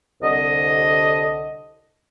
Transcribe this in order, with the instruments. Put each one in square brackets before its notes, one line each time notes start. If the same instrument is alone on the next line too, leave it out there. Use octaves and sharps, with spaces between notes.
[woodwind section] C2 D3 D#5